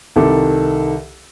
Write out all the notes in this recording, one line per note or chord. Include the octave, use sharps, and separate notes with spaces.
C2 D#3 A4 D6